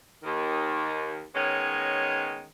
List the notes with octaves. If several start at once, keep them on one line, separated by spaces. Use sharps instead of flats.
D#2 D#3
D#3 G#3 B3 C#4 C#5